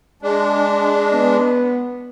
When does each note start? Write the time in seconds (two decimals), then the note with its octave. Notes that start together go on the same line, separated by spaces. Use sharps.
0.22 G#3 D4
1.13 B3